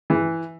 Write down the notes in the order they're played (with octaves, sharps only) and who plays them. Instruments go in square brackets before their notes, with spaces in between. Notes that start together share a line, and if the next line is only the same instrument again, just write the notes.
[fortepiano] E3